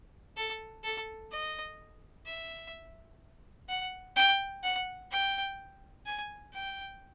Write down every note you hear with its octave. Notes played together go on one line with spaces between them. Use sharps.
A4
A4
D#5
E5
F#5
G5
F#5
G5
G#5
G5